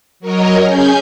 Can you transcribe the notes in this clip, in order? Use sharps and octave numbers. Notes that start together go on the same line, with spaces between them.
F#3 A#4 C#5 D#5
C#4 G#4 G#5 G6